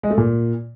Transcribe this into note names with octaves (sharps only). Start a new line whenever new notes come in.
G#3
A3
A#2